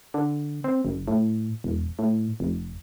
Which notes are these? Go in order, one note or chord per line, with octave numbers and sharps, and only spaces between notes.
D3
C4
F#1
A2
E1
A2
F1